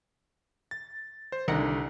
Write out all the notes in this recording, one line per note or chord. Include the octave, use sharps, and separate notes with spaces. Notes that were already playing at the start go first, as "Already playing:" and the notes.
A6
C5
C2 D3 D#3 A#4 F#5